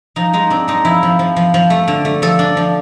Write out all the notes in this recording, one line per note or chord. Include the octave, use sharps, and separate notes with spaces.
F3 D#4
G#3 D#4
C4 D4
G#3 D#4
F3 E4
F3
F3
F3
F3
A3
D3
A3
F3 A4
D4
F3